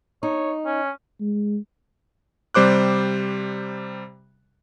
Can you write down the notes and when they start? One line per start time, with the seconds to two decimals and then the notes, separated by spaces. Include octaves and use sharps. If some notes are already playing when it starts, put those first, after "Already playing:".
0.23 D#4 C#5
0.66 C#4
1.20 G#3
2.54 C3 G3 C5 D6 F#6